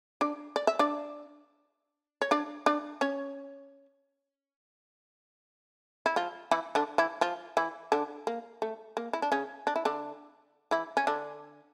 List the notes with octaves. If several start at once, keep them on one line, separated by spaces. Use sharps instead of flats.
D4 D5
D5
E5
D4 D5
C#5
D4 D5
D4 D5
C#4 C#5
E4
F3 F4
E3 E4
D3 D4
E3 E4
F3 F4
E3 E4
D3 D4
A#3
A3
A#3
E4
D4
C#3 C#4
D4
E4
D3 D4
E3 E4
C#4
D3 D4